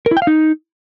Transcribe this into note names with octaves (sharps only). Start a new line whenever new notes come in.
A#4
E4
G5
F5
D#4